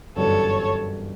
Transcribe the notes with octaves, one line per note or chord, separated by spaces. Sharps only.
G1 F#2 E3 G3 A4 C#5